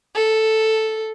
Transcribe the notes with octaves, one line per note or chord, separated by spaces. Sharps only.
A4